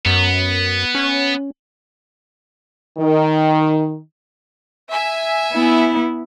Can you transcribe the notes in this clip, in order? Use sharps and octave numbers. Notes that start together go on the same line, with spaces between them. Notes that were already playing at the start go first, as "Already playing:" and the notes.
F#2 B3
C#4
D#3
E5 G#5
B3 E4